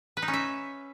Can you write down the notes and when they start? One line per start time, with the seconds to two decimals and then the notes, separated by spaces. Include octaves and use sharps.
0.17 B4
0.22 D#4
0.28 C#4
0.34 E5